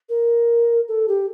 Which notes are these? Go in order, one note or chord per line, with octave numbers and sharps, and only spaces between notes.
A#4
A4
G4